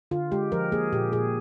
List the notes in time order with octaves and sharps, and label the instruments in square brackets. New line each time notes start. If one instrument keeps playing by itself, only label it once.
[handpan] D3 F4
G#3 G4
F3 A#4
A#3 G#4
A#2 G4
A#2 G#4